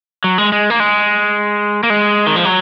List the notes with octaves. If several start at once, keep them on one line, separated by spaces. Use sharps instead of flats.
F#3
G#3
G#3
A#3
G#3
A#3
G#3
D#3
F3
F#3